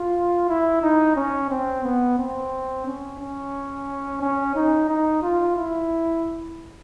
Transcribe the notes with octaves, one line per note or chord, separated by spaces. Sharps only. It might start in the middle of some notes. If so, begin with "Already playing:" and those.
Already playing: F4
E4
D#4
C#4
C4
B3
C4
C#4
C#4
C#4
D#4
D#4
F4
E4